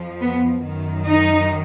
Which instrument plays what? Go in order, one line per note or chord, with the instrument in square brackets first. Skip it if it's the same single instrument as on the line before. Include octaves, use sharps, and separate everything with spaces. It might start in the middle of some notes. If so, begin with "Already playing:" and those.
Already playing: [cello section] F2 F3
B3
F#2 D#3
D#4